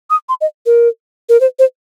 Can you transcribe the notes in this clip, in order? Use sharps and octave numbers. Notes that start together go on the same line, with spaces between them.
D#6
C6
D#5
A#4
A#4
C5
C5